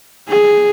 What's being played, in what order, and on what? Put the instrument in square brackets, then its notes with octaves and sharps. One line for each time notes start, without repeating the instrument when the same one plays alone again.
[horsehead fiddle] G#4